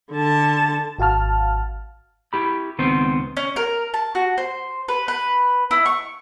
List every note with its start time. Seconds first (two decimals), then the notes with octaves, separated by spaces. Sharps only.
0.12 D3 A5
0.98 G#1 F#4 F5 A5 F6
2.33 E4 G4 B5
2.79 C#2 D#3 B3 C4 C5
3.37 C#4
3.56 A#4
3.94 A5
4.15 F#4
4.38 C5
4.88 B4
5.08 B4
5.71 E4
5.86 C#6